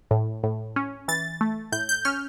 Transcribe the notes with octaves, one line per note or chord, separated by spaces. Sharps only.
A2
A2
C#4
E3 A6
A3
A2 G6
G6
C#4 F6